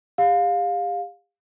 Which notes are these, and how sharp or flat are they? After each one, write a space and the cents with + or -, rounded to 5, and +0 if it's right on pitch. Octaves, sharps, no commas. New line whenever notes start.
G4 +40 F5 +20